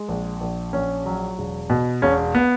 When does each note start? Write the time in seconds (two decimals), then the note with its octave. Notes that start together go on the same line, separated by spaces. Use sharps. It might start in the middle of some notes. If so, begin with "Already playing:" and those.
Already playing: G#3
0.08 A#1
0.41 A#1
0.73 A#1 C#4
1.06 F#3
1.38 E1
1.70 B2
2.02 E1 C#4
2.35 B3